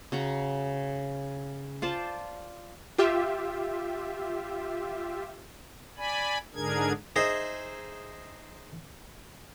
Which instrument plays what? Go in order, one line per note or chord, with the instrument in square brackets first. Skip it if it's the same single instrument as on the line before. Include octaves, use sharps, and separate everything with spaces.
[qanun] C#3 F#4 A#5
F4 C5 D5 A5
[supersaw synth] F4 G4 E5
[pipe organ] D5 G#5 B5
G#2 D3 D4 G#4 A#4 G#6
[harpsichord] D#4 G#4 C5 D#5 E5